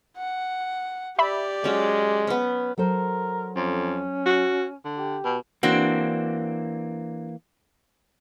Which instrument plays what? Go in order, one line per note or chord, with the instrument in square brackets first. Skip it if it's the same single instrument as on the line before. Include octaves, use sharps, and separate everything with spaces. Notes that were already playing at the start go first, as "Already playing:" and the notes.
[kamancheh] F#5
[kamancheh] G4 D5 [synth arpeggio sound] E5 B5
[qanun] F#3 C#4 [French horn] G#3
[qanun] B3 C#4
[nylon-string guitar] F#3 A4 C5 [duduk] A#4
[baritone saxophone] F2 [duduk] C#4
[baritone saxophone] F#4
D3
[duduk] G4
[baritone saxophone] B2
[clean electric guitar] E3 A#3 [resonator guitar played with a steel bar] C4 D4 F#4